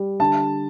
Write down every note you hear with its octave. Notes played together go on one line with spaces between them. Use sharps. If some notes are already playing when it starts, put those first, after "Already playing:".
Already playing: G3
D3 A5